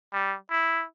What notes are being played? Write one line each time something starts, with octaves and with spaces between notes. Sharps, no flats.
G3
E4